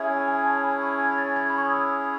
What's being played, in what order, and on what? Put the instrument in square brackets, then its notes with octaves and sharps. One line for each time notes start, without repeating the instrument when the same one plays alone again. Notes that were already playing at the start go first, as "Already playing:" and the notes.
Already playing: [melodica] C#4 E4 G#4 C#5 [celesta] E5
[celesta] G#5
G#5
A5
B5
C#6
G#6
A6
G#6
B5
C#6
D#6
E6